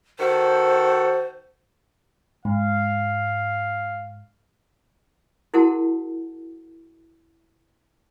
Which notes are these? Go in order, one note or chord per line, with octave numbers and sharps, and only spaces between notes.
D#3 F#4 A4 C5
G#2 F5
E4 F#4 G#4 A#4 F#5 A5